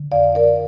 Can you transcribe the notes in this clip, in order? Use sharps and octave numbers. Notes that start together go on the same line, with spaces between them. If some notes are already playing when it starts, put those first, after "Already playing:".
Already playing: D3
F2 D5 F5
A#4 D5